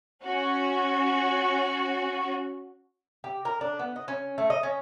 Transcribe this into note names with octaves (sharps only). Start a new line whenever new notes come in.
C#4 F#4
G4
A#4
D4
B3
D#5
C#4
A3
D#5
C#4